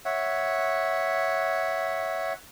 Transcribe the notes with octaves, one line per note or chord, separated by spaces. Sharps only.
C#5 E5 F#5